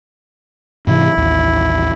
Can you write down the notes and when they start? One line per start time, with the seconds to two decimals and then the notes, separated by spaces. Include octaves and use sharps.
0.87 G#2 C3 E3 E4
1.17 A1 D#2